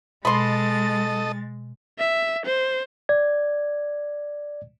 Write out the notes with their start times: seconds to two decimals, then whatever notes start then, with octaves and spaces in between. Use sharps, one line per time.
0.25 B2 G#3 A4 D#5 B5 C6 A6
1.98 E5
2.45 C5
3.09 D5 G#6